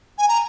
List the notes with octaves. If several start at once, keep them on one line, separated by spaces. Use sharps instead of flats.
G#5
A#5